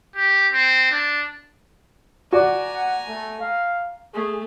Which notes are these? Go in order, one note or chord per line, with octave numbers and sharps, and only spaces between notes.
G4
C4
D4
F#4 D5 G#5 A#5
F#5
A3
F5
A3 G#4